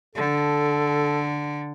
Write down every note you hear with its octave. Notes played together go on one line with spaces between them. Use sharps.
D3 A4